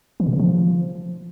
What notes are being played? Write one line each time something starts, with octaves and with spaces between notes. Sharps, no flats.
E3
B2
C#3
F3